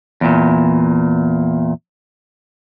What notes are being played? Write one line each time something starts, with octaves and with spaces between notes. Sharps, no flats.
E2 A#2